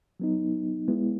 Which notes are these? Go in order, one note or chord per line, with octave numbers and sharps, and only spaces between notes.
F#3 B3 D#4
G#3 B3 E4